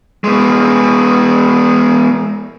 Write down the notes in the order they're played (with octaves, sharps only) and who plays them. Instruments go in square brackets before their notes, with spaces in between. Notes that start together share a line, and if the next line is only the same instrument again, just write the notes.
[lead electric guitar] G#3 B3